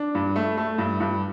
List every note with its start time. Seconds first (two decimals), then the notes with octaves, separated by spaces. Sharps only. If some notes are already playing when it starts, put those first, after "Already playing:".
Already playing: D4
0.15 G2
0.36 A3
0.57 A3
0.78 G2
1.00 G2